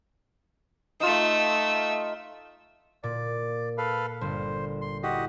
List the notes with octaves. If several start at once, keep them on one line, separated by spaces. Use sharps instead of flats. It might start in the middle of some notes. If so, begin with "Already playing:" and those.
A3 D#4 F4 E6
A#2 D5
A4 B4 F5
G1 C5
C6
E4 F#4 G4 D#5